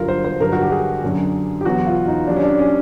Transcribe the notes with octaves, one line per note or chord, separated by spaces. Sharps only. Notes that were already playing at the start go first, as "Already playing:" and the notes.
Already playing: G2 D3 F#3 F4 A#4
C5
C5
G2 D3 F#3 A#4
F#4
G4
G#4
F#2 D3 F#3
G4
E2 B2 F#3 F#4
F4
D#4
D#2 D#3 F#3 D4
C#4
D4
C#4